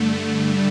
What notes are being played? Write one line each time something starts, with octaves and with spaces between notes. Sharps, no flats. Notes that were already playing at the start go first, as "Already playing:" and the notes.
Already playing: G2 D3 A3
G3